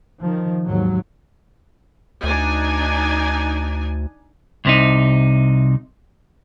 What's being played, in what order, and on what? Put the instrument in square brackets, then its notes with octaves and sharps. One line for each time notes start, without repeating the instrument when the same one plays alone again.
[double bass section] D#3 F3
D#2 G#2 F#3
[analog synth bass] D2 [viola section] D4 D#4 G#5
[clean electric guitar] C2 C3 D#4